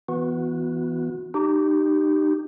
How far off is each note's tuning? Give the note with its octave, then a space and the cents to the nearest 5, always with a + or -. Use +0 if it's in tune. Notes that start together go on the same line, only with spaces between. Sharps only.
E3 +0 B3 +0 F#4 -20
D#4 -30 G4 -10